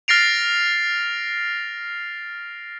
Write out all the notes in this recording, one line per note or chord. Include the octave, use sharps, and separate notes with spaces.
F6 A6 A#6 C7 D7 F7